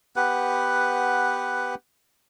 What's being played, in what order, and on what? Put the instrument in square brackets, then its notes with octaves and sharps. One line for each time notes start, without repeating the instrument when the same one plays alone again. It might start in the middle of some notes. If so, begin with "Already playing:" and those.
[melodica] B3 G4 B4 F#5